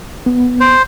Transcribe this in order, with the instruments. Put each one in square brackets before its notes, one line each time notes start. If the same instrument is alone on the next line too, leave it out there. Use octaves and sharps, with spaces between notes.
[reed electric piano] B3
[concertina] C5